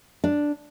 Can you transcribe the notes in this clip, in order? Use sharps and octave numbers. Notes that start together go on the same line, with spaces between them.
D4